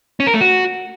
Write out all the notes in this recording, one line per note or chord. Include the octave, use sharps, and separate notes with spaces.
C#4
A#4
A3
F#4